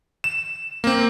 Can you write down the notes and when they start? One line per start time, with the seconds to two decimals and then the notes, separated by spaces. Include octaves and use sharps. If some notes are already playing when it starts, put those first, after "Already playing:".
0.24 E7
0.84 A#3 C4